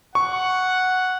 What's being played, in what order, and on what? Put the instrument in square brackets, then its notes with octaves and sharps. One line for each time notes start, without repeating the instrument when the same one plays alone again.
[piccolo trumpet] F#5 [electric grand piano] C#6